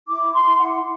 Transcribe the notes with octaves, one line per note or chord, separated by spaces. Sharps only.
E4 D6
C6
E4
F#5